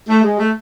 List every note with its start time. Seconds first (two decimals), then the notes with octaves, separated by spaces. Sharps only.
0.09 A3
0.24 G#3
0.39 A3